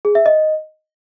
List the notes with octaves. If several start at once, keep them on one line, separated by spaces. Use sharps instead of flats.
G#4
E5
D#5